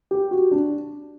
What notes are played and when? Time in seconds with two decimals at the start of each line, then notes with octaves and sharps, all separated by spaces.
0.11 G4
0.31 F#4
0.51 D4